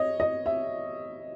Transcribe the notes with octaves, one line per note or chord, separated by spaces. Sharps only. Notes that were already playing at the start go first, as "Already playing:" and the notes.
Already playing: C#5 D#5
D#5
E5